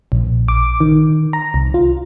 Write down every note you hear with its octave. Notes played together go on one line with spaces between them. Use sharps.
A#1
D6
D#3
A#5
C2
F4